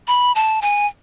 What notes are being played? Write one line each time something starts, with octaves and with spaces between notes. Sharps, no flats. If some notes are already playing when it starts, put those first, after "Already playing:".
B5
A5
G#5